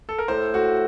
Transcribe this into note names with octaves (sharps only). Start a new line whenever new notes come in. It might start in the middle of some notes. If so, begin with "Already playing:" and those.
A4
A#4
A2 C5
A2 F#4